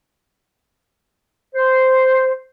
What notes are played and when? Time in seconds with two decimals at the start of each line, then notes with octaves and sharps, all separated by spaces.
1.54 C5